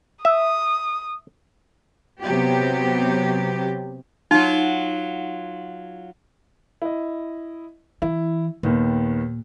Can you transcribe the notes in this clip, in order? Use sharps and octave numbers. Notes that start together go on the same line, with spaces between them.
E5 D#6
C3 F#3 B3 G4
F#3 D#4 F4
E4 D#5
E3 E4
D#2 A#2 D#3 B3